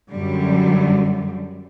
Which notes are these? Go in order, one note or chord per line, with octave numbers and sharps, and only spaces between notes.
F#2 D3 G3